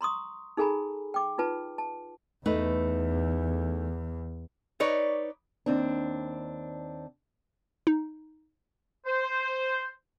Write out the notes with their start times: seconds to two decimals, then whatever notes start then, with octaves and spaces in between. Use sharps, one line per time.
0.01 A#5 C6 C#6 D#6
0.57 D#4 G#4 A4 G#5 A#5 B5
1.14 G5 D6
1.38 D#4 F4 B4 A5
1.78 A5
2.46 E2 A3 D#4 B4
4.80 D#4 B4 C#5 D5
5.66 D#2 C4 D4
7.87 D#4
9.06 C5